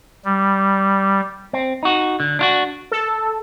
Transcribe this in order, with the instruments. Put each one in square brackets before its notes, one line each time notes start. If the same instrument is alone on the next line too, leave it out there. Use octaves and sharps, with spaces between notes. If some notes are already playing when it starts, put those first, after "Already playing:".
[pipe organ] G3
[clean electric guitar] C4
D#4 F#4
D3
D4 F4 F#4
[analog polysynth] A4